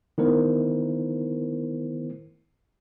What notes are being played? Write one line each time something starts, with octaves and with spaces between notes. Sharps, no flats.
D#3 A3 B3 E4 A#4 C5